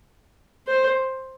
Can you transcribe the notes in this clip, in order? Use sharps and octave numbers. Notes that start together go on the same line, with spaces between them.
C5